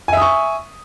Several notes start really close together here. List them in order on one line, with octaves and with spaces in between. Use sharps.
G#5 E5 D#6 C#6